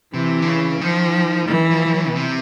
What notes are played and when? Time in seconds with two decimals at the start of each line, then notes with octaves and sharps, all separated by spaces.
0.14 C3 E3
0.42 D3
0.48 C#3
0.81 D#3 F3
1.49 E3
1.71 F3
1.86 F3
1.94 F#3
2.08 B2
2.15 C3